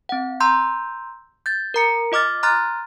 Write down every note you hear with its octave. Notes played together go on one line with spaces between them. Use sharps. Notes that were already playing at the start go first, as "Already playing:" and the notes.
C4 F#5
A#5 C6 E6 G6
G6 A6
A#4 A#5 C#7
F4 D#5 D6 F6 A6
A#5 C6 F6 F#6 A6